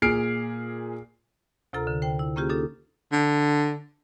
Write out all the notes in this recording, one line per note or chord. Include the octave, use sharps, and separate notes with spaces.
A#2 G#4 F6 C7 D7
D2 C3 F4 A4 A#4 A#5
D3
C5 G5
E4
A#3 C#4 F4 G4 G#4
D4 D#4 G4 A4
D3